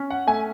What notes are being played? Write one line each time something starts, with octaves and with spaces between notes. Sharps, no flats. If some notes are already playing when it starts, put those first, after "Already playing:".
Already playing: C#4
F#5
A3 G#5